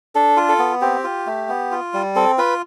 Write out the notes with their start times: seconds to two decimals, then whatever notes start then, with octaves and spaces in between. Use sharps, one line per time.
0.15 D4 A4
0.37 F4
0.49 A4
0.59 B3
0.81 C4 G4
1.04 F4
1.27 A3
1.49 B3
1.71 F4
1.94 G3
2.16 C4 A4
2.38 F4 B4